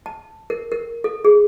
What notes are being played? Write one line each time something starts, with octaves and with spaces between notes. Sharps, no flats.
A5
A#4
A#4
A4
G#4